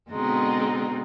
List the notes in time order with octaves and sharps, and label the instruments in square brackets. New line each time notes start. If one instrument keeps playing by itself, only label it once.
[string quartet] B2 D3 G#3 C4 D#4